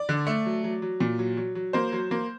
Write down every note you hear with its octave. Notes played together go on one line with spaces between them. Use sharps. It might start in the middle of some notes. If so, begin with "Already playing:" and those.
Already playing: D5
D3
A3
F#3
F#3
F#3
A#2
F#3
F#3
F#3
A#3 C5
F#3
A#3